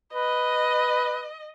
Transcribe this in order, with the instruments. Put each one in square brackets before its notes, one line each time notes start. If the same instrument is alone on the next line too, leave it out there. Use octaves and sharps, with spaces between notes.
[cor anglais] B4 [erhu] D#5